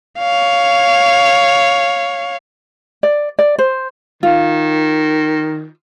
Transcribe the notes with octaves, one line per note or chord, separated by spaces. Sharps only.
C#5 F5
D5
D5
C5
D#3 F4